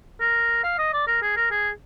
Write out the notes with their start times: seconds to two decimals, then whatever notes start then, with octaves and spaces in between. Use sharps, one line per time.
0.20 A#4
0.64 F5
0.78 D#5
0.93 D5
1.07 A#4
1.22 G#4
1.36 A#4
1.51 G#4